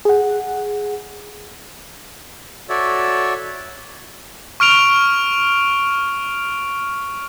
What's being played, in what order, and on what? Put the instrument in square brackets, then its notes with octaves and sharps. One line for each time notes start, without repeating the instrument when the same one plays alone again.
[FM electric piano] G#4 F#5
[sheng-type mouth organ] F#4 A4 C#5 D5 E5
[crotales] C#6 F6 D7 F7